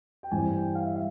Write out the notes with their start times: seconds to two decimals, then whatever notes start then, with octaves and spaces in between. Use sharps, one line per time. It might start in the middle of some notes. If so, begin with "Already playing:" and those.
0.23 G5
0.31 G2 E3 G3 C4 G#5
0.54 G5
0.75 F5
0.85 E5
0.95 F5